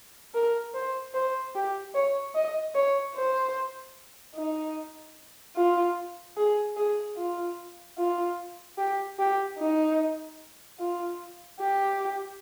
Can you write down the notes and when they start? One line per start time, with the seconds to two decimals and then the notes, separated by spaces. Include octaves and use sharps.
0.34 A#4
0.74 C5
1.14 C5
1.55 G4
1.94 C#5
2.35 D#5
2.75 C#5
3.16 C5
4.35 D#4
5.56 F4
6.37 G#4
6.77 G#4
7.17 F4
7.98 F4
8.78 G4
9.19 G4
9.58 D#4
10.80 F4
11.60 G4